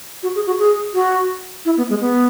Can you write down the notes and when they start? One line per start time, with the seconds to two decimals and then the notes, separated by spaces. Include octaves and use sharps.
0.23 F#4
0.35 G#4
0.47 F#4
0.59 G#4
0.94 F#4
1.65 E4
1.77 B3
1.89 G#3
2.01 B3